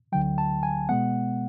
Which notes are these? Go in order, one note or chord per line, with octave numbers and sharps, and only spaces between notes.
D2 D3 F#3 G5
A5
G#5
B2 G#3 B3 F#5